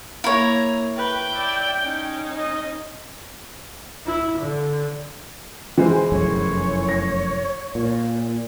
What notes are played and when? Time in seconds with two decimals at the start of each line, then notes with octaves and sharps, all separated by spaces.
0.24 A#3 E4 C#5 A#5
0.97 B4 G5
1.33 D5 E5
1.83 C#4 D#4
2.36 D#5
4.06 E4
4.38 D3
5.78 E3 G#3 C5
6.12 F1 F#2 A2 C#5
6.89 A#6
7.75 A#2